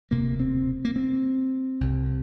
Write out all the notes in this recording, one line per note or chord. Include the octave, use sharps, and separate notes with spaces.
E1 D2 C3 A#3
C4
A#3
C4
C2 C3